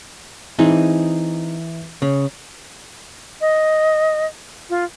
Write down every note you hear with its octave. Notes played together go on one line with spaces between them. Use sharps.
E3 C4 D#4 G#4
C#3
D#5
F4